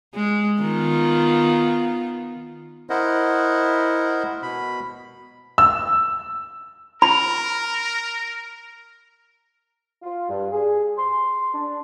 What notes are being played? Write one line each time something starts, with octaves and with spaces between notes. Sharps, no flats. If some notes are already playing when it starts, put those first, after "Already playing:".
G#3
D#3 B3 F4
E4 A#4 C5 D#5 F#5
B2 B5
E6
A#4 B5
F4
G2
G#4
C6
D4